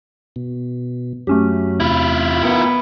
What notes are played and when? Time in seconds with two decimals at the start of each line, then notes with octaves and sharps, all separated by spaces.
0.36 B2
1.27 F#2 F#3 A3 C#4 G4
1.80 E2 C3 E4 F4 B5
2.43 B3 A#4 G5